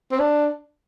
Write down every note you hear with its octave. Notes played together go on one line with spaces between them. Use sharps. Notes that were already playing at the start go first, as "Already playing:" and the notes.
C4
D4